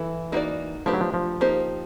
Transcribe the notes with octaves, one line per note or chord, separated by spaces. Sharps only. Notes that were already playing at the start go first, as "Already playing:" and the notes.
Already playing: E3 E4 A4
A#3 D#4 F#4 B4 D5
F3 A3 D4 G4 B4
F#3
F3
F3
A#3 D#4 G4 C5